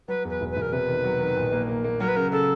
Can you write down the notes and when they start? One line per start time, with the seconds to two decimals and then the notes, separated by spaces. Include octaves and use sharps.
0.08 F#3 B4
0.25 E2 B4
0.41 E1
0.51 B4
0.56 E1
0.62 A#4
0.72 C3 B4
0.88 D#3
1.04 F#3
1.20 D#3
1.37 A#1
1.52 A#3
1.69 A#3
1.84 A#3
2.00 F#3 A#4
2.08 B4
2.16 C#3 A#4
2.32 C#3 A4